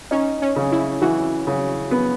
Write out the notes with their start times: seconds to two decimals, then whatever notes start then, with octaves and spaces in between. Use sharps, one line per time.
0.11 C#4 D#4
0.42 C#4
0.56 C#3
0.72 E4
1.02 E3 F#4
1.47 C#3
1.91 B3